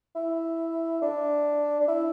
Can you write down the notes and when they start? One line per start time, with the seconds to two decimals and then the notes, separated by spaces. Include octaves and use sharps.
0.16 E4
1.02 D4
1.80 D4
1.88 E4